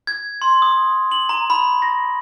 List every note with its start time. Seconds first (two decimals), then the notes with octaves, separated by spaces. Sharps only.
0.07 G#6
0.42 C6
0.62 D#6
1.12 F#7
1.29 A#5
1.50 B5
1.82 A#6